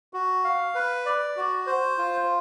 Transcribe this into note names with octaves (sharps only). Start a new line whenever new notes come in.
F#4
F5
B4
D5
F#4
C5
F4